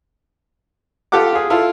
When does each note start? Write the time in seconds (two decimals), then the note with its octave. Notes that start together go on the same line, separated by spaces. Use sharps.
1.12 F4 G4 A4 F#5 D6
1.33 F4 G#4
1.50 E4 F4 A4